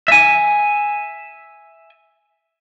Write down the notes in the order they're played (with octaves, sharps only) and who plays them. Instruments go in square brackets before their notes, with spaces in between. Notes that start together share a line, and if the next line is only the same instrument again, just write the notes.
[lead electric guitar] E5 G#5